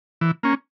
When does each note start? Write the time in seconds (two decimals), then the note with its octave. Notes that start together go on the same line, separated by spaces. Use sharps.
0.21 E3
0.43 A#3 C#4